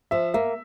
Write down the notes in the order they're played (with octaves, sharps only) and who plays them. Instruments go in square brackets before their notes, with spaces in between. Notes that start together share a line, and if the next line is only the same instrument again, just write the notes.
[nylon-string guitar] F3 [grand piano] E5
[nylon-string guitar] A#3 [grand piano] E5